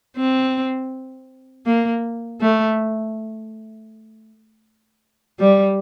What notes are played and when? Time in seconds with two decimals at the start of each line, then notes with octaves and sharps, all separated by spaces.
0.17 C4
1.66 A#3
2.41 A3
5.39 G3